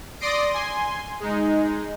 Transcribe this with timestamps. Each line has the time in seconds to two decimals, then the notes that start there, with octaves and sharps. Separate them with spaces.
0.20 D5 C6 D#6 A#6 C7 D7
0.50 G#5 C6
1.20 G#3 D#4